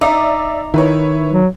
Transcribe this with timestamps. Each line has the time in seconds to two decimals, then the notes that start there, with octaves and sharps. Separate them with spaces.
0.01 D#4 D5 E5 D6
0.74 D#3 E4 B4 C#5
1.32 F#3